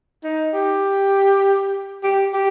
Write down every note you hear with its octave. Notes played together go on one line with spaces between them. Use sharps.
D#4
G4
G4
G4